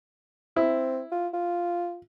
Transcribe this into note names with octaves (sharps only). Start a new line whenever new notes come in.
C4 E4
F4
F4